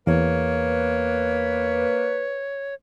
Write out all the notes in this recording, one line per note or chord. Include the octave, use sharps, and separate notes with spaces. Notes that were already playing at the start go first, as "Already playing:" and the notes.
E2 A#3 B4 C#5